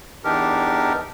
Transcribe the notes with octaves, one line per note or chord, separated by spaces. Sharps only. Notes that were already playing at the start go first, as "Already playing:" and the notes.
E2 E3 D4 D#4 G4 A#4